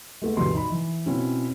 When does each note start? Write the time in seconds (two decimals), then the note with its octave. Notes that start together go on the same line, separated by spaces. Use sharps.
0.22 G#3 A3 B3
0.37 D2 G2 B2 E3 C6
0.54 D#4 B5
0.72 E3
1.06 B2 C4 C#4 E4